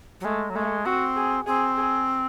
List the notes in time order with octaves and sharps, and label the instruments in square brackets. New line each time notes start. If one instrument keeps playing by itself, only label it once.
[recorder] F#3
[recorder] G#3 [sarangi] A3
[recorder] F#3
[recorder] G#3 [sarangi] A3
[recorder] C4 [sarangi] F#4
[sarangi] G#4
[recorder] C4 [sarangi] G#4
[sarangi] G#4